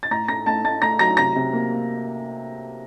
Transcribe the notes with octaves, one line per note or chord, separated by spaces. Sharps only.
A6
A2 A#5 A#6
A3 A#5 A#6
A3 A5 A6
A3 A5 A6
A3 A#5 A#6
F#3 A#5 A#6
C3 A#5 A#6
C3
A#3
A#3